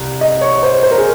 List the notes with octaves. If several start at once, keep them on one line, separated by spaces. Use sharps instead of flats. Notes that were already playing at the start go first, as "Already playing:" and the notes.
Already playing: C2
D#5
C#5
C5
C5
A#4
G#4